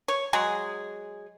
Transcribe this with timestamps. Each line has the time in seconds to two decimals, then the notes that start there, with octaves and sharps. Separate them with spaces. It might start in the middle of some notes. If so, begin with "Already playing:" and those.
0.08 C#5
0.33 F#3 G#3 G#4